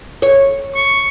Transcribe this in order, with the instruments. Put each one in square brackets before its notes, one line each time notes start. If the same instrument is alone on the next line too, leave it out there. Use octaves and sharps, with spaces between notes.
[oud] C#5
[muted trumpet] C#6